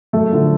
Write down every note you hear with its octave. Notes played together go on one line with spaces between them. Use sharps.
F#2 A3 A4
D3 F3 A3